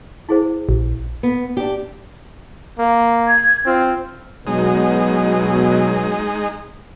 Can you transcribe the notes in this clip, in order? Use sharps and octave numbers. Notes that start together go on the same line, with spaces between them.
E4 G#4 C5
A#1
B3
D4 G4
A#3
G#6
C4 F4
B2 F#3 G#3 D#4